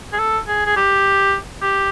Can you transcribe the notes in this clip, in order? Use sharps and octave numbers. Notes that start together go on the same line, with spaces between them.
G#4
A4
G#4
G#4
G4
G4